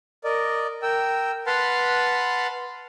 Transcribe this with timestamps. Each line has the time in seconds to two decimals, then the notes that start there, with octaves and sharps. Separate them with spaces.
0.24 A#4 D5 D#5
0.82 A#4 G5 E6
1.47 B4 F#5 A5 B5 C6 F6